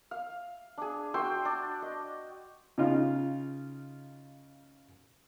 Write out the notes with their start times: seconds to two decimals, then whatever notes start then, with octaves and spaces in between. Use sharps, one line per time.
0.11 F5
0.78 D4 G#4
1.14 F#4 G5 C6 E6
1.45 D4
1.82 D#5
2.78 C#3 D#4 F4